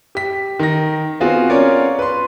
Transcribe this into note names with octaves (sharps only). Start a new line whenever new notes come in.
G4 B6
D#3 A#6
B3 C4 F4 F#4 G#4
C#4 F4 A#4 C#5 D5
B4 C6